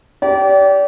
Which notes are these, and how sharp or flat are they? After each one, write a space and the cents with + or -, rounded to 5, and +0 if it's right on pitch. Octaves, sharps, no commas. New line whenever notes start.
G4 -20 D5 -35